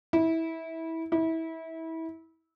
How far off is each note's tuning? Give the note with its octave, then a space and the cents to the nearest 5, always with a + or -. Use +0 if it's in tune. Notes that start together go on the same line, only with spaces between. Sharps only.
E4 -20
E4 -25